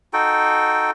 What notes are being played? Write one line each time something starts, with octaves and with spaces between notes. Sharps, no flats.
D#4 F#4 A4 G5